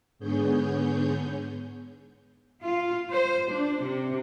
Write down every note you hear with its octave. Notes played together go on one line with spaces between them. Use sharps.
G#2 D3 B3 G#4 C#5 G6
F4
C5
D4
C3